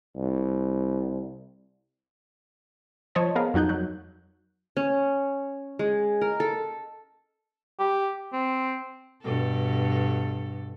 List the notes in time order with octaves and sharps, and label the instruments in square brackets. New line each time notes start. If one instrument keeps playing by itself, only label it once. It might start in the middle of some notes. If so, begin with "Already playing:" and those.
[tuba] C2
[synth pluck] F3 C5 C#5 D#5 A5
B3 G#4 A#4 F5
F2 F#3 D#4 F#6 G6
F#3 F#6
[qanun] C#4
G#3
A#4
A4
[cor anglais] G4
C4
[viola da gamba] G2 B2 A4